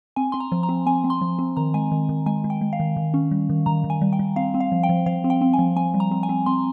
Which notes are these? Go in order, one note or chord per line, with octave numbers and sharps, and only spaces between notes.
C4 G#5
C4 C6
A#5
F3
A#5
C4
C4 G#5
C4
C6
F3
C4
D#3 A#5
G#3 G#5
D#3
D#3
G#3 G#5
G#3
G5
G#3
F5
D#3
D#3
C#4
G3
D#3
D#3 A#5
D#3
G#5
G3
G5
G3
C4 F5
C4
F5
F3
G5
F3
F3 F5
C4
G5
C4
G#5
F3
C4 G#5
G3
A#5
C4
G#5
C4
C4 C6